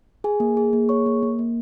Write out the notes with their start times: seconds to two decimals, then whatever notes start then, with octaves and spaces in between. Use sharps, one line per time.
0.24 G#4 G#5
0.40 A#3
0.57 G#4
0.73 A#3
0.89 G#4 C#5 C#6
1.06 A#3
1.23 A#3
1.39 A#3